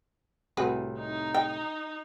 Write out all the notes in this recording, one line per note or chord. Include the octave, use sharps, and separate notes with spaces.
C2 A2 F#4 G#4 B4
D#4 A#5
G5